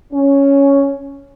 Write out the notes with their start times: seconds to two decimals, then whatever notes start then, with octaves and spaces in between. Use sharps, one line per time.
0.13 C#4